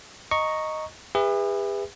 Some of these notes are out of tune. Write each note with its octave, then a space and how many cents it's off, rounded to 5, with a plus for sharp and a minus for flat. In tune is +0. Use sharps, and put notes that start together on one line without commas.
D#5 +0 A#5 +0 C#6 +0
G#4 -45 B4 +0 E5 +0